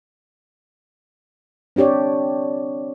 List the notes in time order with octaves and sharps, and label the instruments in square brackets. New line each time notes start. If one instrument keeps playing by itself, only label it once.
[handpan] C4 D4 G4 C#5 D5